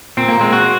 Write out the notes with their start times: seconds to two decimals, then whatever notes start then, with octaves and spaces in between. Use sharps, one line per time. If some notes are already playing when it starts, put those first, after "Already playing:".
0.17 A#2 C4
0.28 A#3
0.40 G#3 C4
0.53 F#4